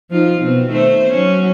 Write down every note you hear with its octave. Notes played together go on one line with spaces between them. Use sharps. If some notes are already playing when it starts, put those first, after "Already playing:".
F3 D#4 F4
B2 C4
D#3 A3 C5
F#3 C#4